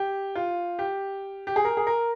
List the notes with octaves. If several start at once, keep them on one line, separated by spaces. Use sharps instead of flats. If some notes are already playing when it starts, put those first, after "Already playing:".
Already playing: G4
F4
G4
G4
G#4
A#4
G#4
A#4